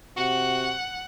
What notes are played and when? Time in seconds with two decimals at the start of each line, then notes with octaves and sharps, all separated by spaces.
0.17 C3 F#4 F#5